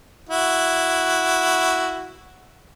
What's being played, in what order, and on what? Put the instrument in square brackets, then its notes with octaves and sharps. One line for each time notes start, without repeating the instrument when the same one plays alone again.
[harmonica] E4 F#4